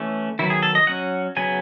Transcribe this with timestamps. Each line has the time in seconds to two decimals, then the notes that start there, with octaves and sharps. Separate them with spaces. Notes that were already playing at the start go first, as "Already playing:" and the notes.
Already playing: E3 A3 C#4
0.39 D#3 F#3 B3 E4
0.50 G#4
0.63 A4
0.75 D#5
0.87 F#3 C#4 F#5
1.36 C#3 F#3 B3 G#5